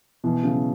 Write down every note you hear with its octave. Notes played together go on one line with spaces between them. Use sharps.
B2 E3
C#3 F#3